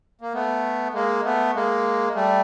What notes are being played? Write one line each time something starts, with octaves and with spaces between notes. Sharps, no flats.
A#3
A3 B3
G#3 A#3
A3 B3
G#3 A#3
G3 A3